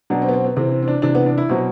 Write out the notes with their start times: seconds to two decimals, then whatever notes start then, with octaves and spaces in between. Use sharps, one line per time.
0.10 B2 F#3 D4
0.22 C4
0.29 B3
0.33 C4
0.44 B3
0.56 C3 E3 C4
0.71 C4
0.83 C4
0.88 D4
1.02 C3 E3 D4
1.15 B3
1.26 D4
1.38 E4
1.49 B2 F#3 C4